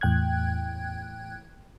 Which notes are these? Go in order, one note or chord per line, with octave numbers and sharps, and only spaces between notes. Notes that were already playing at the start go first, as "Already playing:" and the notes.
E2 A2 G5 F#6 G#6